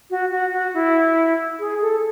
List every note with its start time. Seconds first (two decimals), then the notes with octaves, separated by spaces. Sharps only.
0.10 F#4
0.31 F#4
0.53 F#4
0.74 E4
1.59 G#4
1.81 A4